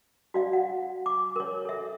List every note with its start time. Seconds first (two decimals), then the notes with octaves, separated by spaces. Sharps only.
0.34 F#4 D5 F5
0.53 F#5
1.06 D6
1.36 A#4 C#5
1.65 A4 E5